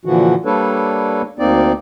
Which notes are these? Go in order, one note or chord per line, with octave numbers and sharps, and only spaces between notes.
A#2 D3 E3 F3 F#4
G3 A#3 D4 A4 B4 C#5
D2 A#3 C4 D#4 D5